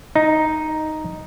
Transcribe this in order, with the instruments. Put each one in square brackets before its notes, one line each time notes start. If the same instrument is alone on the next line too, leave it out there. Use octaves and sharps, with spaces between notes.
[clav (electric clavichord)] D#4